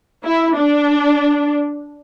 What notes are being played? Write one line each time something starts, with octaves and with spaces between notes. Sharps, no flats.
E4
D4